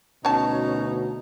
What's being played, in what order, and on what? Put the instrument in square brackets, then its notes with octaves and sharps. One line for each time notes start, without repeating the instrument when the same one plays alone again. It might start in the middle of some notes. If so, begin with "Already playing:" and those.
[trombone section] D2 B2 [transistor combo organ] C#4 [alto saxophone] D#4 [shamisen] C#5 A5